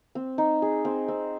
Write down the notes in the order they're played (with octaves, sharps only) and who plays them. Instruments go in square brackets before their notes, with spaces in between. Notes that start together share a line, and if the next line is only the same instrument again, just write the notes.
[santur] C4
D#4
G#4
C4
C4